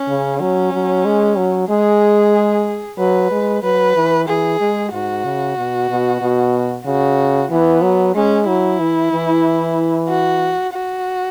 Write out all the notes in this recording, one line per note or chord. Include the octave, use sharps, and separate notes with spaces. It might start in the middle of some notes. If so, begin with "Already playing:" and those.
Already playing: C#4
C#3
F#3 C#4
F#3
G#3
F#3
G#3 G#4
F#3 B4
G#3
F#3 B4
E3
E3 G#4
G#3
G#2 F#4
C#3
B2
B2
B2
C#3 F#4
E3 B3
F#3
G#3 C#4
F#3 E4
E3
E3
F#4
F#4